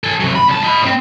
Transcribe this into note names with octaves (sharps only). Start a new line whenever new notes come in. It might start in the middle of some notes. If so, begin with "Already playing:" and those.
A4 G#5
C3 F#3
B5
C2 A5
D#5 B5
A2 C4